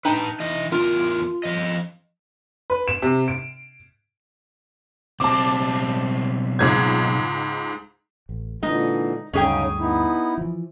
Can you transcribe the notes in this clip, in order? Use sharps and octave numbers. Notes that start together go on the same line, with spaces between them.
D#4 B4 G5 A5
E3 D#5
E2 F4 A#4
F3 D#5
B4
E7
C3
D7
B1 C4 A5 D6
C#2 G#2 G#6
A1
A#2 D3 E3 G#3 D#4
D2 G2 C#3 F#3 C#4 D#4 G#4 G5
B3 D#4 E4
E3 F3